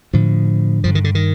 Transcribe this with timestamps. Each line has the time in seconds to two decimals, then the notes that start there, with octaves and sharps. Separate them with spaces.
0.13 A2 D3 F3
0.84 G2 D3 F3
0.95 D#3
1.04 D3
1.15 D#3